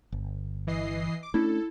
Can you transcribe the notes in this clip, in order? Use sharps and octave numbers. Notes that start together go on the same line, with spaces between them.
G1
E3 D#5 C7
D6
A3 C#4 D4 E4 A4